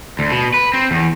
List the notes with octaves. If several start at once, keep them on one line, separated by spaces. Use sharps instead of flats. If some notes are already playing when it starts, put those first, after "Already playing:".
D2
B2
B4
C4
E2